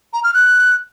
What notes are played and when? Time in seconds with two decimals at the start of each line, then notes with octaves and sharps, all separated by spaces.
0.13 A#5
0.24 F6
0.34 F#6